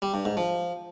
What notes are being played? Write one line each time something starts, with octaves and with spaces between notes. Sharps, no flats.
G3
G2
G#2
F3